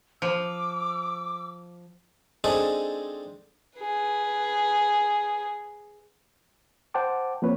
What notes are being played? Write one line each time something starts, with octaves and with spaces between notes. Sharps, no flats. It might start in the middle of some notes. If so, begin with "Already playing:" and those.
F3 D6 E6
G#3 C4 D4 D#4 G#4 A4
G#4 B4
C5 F#5 G5 A5 D6
F3 A#3 C4 B4 C#5